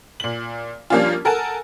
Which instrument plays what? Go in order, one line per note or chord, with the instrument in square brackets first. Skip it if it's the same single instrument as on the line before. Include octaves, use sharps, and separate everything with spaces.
[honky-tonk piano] A#2 F#7
F3 G3 A#3 C#4 D4 F4
A4 A#4 F#5 G#5 A5